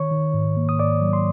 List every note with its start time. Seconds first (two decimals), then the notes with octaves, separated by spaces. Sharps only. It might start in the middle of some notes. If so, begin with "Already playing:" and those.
Already playing: D#3 C#5 C#6
0.11 D#3
0.34 G#2
0.57 A#3
0.69 D#6
0.79 G#2 D5 D6
1.01 F#3
1.13 C6